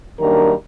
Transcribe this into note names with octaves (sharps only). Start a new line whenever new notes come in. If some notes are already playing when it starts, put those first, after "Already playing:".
F#2 D#3 G3 A#3 D4 A#4